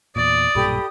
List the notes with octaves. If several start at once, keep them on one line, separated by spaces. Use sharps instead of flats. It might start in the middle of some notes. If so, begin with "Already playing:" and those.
E2 A#2 D5 D#6
B1 G2 A#2 G4 A4 B5